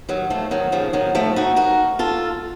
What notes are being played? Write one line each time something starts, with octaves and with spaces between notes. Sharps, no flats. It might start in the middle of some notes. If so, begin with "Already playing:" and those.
D#3 F#3
F3 A3
D#3 F#3
C#3 F3
D#3 F#3
F3 A3
D#4 F#4
F#4 A#4
F4 A4